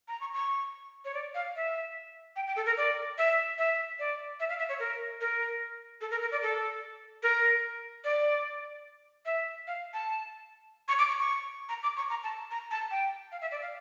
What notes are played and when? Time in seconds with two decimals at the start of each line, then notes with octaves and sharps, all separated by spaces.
0.08 A#5
0.21 C#6
0.34 C#6
1.05 C#5
1.14 D5
1.35 F5
1.56 E5
2.36 G5
2.47 G5
2.56 A4
2.66 A#4
2.77 D5
3.18 E5
3.58 E5
3.99 D5
4.40 E5
4.49 F5
4.59 E5
4.69 C#5
4.80 A#4
5.21 A#4
6.01 A4
6.11 A#4
6.21 A#4
6.31 D5
6.42 A4
7.23 A#4
8.04 D5
9.25 E5
9.67 F5
9.94 A5
10.88 C#6
10.98 D6
11.08 C#6
11.19 C#6
11.69 A#5
11.83 D6
11.97 C#6
12.10 A#5
12.24 A5
12.51 A#5
12.71 A5
12.91 G5
13.32 F5
13.41 E5
13.51 D5
13.62 F5